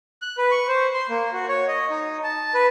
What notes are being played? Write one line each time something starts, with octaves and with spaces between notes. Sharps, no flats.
F#6
B4
C#6
C5
C6
A#3
F#4
C#5
D#5
D#4
A5
B4